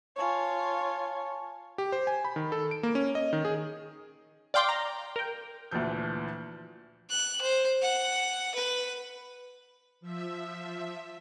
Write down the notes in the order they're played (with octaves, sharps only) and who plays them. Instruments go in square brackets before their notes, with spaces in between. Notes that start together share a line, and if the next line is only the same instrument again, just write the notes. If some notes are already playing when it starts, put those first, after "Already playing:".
[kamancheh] F4 C#5 [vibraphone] G#5 A5 C#6
[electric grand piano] G4
C5
G#5
B5
D#3
A4
D7
A#3
C#4
D#5
D#3
G#4
[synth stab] D5 F5 G5 C6 D6
A#5
A#4 G5
[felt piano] D2 A#2 E3 F3 G6
[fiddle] F#6
C5
F#5
B4
[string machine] F3 E5